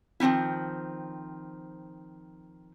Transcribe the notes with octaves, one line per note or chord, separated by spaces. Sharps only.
D#3 F3 C4 D#4 E4